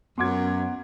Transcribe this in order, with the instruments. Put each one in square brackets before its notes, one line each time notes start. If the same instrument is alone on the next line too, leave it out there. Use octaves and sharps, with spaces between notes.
[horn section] F#2 [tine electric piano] B3 F#5 [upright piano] C6 D6 G#6